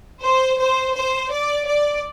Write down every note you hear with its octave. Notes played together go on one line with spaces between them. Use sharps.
C5
C5
C5
D5
D5